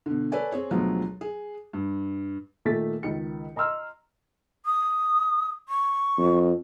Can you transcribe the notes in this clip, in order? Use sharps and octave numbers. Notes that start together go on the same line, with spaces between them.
B2 D3
A4 B4 C#5 D5 G#5
C4 G#4 C#5
D2 B2 F3 F#3 G#3 B3
G#4
G2
A#2 D#3 A3 A4 A6 B6
C#2 D#3 D#4 C#7
D#5 A#5 C6 E6 F6
D#6
C#6
F2